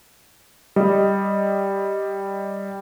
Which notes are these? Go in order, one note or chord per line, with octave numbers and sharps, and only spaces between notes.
G3 D#5